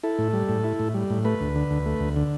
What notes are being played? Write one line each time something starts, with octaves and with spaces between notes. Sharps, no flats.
E4 A4
A2
G3
A2
E4
A2
G3
A2
A3 B4
D2
D3
D2
A3
D2
D3